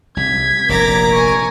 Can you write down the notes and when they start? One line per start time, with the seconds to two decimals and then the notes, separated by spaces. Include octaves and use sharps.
0.17 C2 G#6 B6
0.69 F1 A#1 G2 A#4 A#5 D6
1.13 G#5 C#6